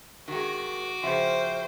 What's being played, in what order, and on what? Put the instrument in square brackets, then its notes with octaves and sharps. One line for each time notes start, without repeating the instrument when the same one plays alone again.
[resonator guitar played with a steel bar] D#3 G#3 [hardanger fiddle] F#4 D6
[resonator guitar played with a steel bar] C#3 F3 [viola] C5 [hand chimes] E5 G5 C6